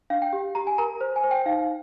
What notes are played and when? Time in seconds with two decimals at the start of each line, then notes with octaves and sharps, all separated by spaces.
0.10 D4 F5
0.22 G5
0.33 G4
0.55 G4 A#5
0.67 G#5
0.78 A#4 A#5
1.01 C5
1.16 G#5
1.24 C5
1.31 G5
1.46 D#4 F5